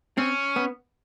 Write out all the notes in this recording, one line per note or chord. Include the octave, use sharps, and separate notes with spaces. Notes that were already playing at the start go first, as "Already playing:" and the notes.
C4 C#4
B3